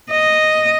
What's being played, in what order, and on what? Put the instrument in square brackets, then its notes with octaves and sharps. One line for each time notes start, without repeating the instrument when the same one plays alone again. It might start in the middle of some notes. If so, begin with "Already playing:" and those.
[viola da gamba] D#5